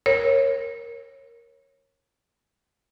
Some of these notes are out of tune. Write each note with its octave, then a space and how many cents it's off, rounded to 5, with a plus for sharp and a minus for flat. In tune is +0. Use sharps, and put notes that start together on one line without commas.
A#4 +5 C#5 -25